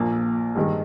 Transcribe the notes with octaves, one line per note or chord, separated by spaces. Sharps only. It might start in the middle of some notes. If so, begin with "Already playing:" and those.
Already playing: A#1 A#2 A#3
G2 D#3 G#3